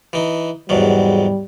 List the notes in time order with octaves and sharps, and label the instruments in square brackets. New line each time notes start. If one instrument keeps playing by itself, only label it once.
[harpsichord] E3 D#4
[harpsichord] E2 G#2 F#3 [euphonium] G3